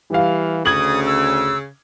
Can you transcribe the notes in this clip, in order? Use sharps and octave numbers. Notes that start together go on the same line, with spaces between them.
E3 G3 F5
D2 C#3 D#6 G#6 F#7
E6